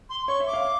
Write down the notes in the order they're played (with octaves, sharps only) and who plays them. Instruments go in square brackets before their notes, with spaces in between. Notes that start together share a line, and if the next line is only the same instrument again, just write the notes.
[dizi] C6
[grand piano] C#5 [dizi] C#6
[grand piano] E5
[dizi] D6
[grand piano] F5